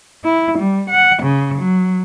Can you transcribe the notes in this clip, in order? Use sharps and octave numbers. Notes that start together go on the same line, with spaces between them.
E4
G3
F#5
C#3
F#3